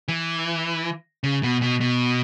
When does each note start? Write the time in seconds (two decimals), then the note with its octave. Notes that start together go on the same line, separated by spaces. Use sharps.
0.08 E3
1.24 C#3
1.43 B2
1.62 B2
1.81 B2